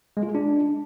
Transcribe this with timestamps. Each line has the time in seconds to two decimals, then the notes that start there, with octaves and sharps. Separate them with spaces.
0.17 G#3
0.23 F4
0.29 G#4
0.35 D4